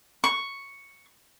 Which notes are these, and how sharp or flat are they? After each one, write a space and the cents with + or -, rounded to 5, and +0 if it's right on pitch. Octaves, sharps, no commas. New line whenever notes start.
C#6 +0